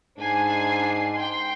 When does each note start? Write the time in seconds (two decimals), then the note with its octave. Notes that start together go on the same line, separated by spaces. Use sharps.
0.19 G#2 D4 G#5 C7
1.16 G5 C6